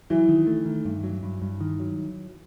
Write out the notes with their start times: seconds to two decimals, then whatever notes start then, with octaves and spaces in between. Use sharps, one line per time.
0.10 E3 F#3
0.29 D#3
0.47 A3
0.66 D#3
0.85 G2
1.04 F#3
1.23 G2
1.42 G2
1.61 D#3
1.80 F#3